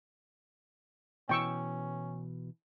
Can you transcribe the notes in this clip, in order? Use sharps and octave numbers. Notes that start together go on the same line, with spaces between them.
B2 E3 C#4 G5 C#6 E6